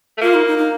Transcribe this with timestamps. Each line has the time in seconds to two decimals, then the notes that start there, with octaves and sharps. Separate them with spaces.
0.18 A3
0.21 A#3 F4
0.34 D#4
0.47 D#4
0.58 D#4